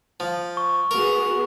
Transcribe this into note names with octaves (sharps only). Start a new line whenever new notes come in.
F3
C#6
B3 F#4 G#4 A#4